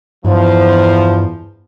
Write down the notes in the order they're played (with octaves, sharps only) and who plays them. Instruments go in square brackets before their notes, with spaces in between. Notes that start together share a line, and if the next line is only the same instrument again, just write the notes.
[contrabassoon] E2 [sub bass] G2 [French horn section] F3